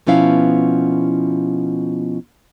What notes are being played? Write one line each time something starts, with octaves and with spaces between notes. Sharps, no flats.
B2 F3 B3 C#4 E4 F5